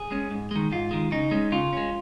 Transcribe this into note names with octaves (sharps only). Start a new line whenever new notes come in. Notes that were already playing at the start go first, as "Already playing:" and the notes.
Already playing: G#4
G#3 C#4
G#2
D#3 G#3
G#2 F4
D#3 G#3
C#3 D#4
G#3 C#4
C#3 F4
G#3 C#4